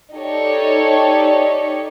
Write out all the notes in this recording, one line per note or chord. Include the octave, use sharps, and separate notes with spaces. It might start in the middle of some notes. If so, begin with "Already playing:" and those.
D#4 G4 A4 C#5 D5